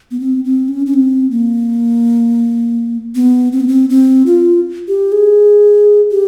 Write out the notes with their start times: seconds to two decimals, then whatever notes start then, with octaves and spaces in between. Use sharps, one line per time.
0.11 B3
0.20 C4
0.45 C4
0.68 C#4
0.86 C#4
0.94 C4
1.31 A#3
3.15 B3
3.53 C4
3.60 B3
3.68 C4
3.89 C4
4.26 F4
4.88 G4
5.12 G#4
6.11 G4